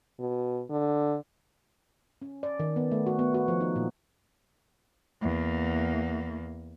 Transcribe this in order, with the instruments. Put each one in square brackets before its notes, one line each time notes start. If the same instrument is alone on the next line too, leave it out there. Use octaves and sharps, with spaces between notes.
[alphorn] B2
D3
[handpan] C#4
D5
D#3
B3
A3
F#4
B3
F#4
F3
D#4
A#2
[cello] E2 A#3